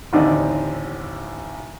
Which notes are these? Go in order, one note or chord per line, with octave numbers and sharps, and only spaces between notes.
A1 D#2 D3 C4 D5 D#5